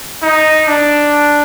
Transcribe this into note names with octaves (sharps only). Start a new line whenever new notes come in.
D#4
D4